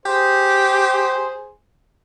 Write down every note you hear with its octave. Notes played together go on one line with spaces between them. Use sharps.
G4 G#4 C5